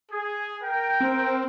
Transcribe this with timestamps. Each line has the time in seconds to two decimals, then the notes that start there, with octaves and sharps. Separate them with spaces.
0.11 G#4
0.63 A#4 G5
1.00 C4